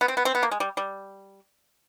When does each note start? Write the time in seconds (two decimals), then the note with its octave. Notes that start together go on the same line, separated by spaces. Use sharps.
0.01 B3
0.08 C4
0.17 B3
0.25 C4
0.35 B3
0.43 A#3
0.51 G#3
0.60 G3
0.77 G3